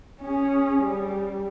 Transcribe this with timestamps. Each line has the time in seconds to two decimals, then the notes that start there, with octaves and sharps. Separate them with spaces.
0.22 C#4 G#4
0.83 G3